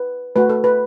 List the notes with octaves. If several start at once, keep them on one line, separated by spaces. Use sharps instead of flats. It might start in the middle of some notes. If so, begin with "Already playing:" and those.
Already playing: B4
A3 F#4 B4
A4
B4